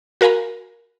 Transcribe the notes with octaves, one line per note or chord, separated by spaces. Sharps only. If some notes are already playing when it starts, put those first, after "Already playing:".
F#4 A#4 F5 G#5 A#5 B5